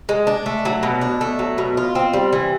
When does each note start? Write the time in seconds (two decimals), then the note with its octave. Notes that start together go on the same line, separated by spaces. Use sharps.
0.09 G#3
0.27 D4
0.46 A3
0.65 F#3
0.83 B2
1.01 D4
1.21 A3
1.39 F#3
1.58 B2
1.77 F4
1.95 C4
2.13 G3
2.33 E3